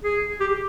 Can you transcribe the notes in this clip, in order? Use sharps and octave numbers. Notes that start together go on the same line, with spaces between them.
G#4
G4